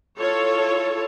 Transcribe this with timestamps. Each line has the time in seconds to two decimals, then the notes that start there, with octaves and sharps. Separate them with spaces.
0.19 E4 F4 A4 C#5